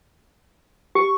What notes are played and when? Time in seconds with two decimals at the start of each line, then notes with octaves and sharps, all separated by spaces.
0.95 G4 C#6